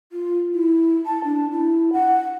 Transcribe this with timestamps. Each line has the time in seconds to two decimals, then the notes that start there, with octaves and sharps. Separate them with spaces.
0.12 F4
0.54 E4
1.06 A5
1.25 D4
1.51 E4
1.93 F#5